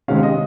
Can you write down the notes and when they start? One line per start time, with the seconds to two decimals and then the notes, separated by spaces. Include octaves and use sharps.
0.08 C3 D#3 G#3 C#4 F5
0.23 D#5